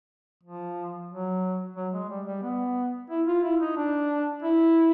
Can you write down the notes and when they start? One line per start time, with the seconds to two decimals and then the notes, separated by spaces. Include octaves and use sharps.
0.43 F3
1.11 F#3
1.76 F#3
1.93 G#3
2.09 G3
2.27 G3
2.43 B3
3.10 E4
3.27 F4
3.44 E4
3.60 D#4
3.77 D4
4.42 E4